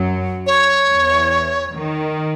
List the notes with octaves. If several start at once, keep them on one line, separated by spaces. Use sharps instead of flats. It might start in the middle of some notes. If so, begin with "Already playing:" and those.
Already playing: F#2 F#3
C#5
E2 E3
D#3